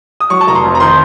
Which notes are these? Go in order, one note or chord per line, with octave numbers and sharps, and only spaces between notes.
D#6
F#3 C#6
A5
F1 A#5
C6
F2
A#5
D#3 C6